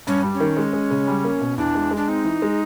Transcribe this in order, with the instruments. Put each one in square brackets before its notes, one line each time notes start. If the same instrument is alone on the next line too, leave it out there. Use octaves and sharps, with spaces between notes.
[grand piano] G2 [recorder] C#4
[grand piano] G3
[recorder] C#4
[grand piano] D#3
G#3
G#3
C#3
G3
A#3
B2
[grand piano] E2 [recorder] D4
[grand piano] G#3
G#3
[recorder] D4
[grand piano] C4 [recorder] D#4
[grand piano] E3
G#3